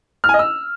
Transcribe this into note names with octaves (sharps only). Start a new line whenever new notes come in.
F6
G#5
D#5
E6